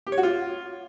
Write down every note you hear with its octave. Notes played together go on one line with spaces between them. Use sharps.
G4
C#5
F#4
F4